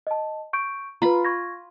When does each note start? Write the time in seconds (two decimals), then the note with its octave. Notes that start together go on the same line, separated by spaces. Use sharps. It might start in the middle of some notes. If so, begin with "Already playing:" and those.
0.07 D#5 A5
0.53 C#6 G6 D7
1.02 F4 B4 A#5 B5
1.25 C#6 G#6 A#6